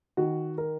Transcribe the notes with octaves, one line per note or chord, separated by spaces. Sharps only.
D#3 F#4
A#4